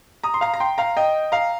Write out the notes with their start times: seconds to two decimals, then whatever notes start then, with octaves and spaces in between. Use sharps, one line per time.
0.24 A#5 D#6
0.34 C6
0.41 F5 A#5
0.54 A#5
0.60 G5 C6
0.78 F5 A#5
0.97 D#5 G5
1.32 F5 A#5